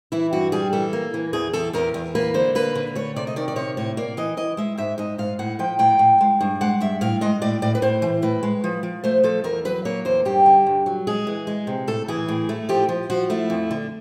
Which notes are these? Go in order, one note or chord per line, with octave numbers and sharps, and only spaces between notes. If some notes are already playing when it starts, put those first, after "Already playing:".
E3 E4
G2 F#4
G3 G#4
E3 A4
A#3
E3
E2 G#4
E2 A4
E2 A#4
E2
A#3 B4
D3 C5
A#3 B4
D3
A3 C#5
C3 D5
D#5
D#3 D5
D5
C3 C#5
A2 C#5
A#3 D5
E3 D#5
E3 D#5
G#3 E5
G#2 E5
G#2 D#5
G#2 F5
A2 F#5
F3 G5
A2 G5
A2
G#3
G2
G#3 F#5
G2 E5
A2 F5
G#3 D#5
A2 D5
A2 D5
B4
A2 C5
E3
A2 B4
G#3
F3
F3
A3 C5
F3 A4
E2 A#4
F#3 B4
A#3 C#5
E2 C5
G2 G4
D3
G2
F#3
G#3 G#4
E3
G#3
C3
A2 A4
E3 G#4
A2
A3
F3 G4
F3
F3 F#4
A3 E4
F2
D3